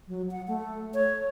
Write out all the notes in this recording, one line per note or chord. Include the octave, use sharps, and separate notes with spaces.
F#3
F#5
A3
C#5